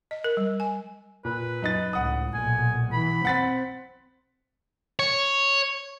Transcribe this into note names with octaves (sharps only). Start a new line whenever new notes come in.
D#5
A#4
G3
G#5
A#2 B4
F#2 D#4 A6
C#2 A2 F#5 D#6
B1 A#2 G#5
E3 B5
C4 F#5 A6 B6
C#5